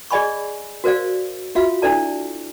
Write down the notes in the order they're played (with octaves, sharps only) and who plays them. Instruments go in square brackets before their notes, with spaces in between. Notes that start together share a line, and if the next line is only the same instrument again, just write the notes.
[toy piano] G#4 D5 D#5 G#5 B5 C#6
F#4 A#4 C5 D5 F5
F4 F#4 E5 F5
D4 E4 A4 D5 A5